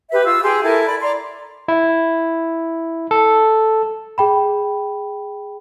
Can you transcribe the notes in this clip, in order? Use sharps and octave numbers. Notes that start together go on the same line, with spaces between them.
G4 B4 E5
F4 E6
G4 G#4 G5 C6
E4 A4 A#4 G#5
D5 B5
D5 A#5 C6
E4
A4
G#4 G5 B5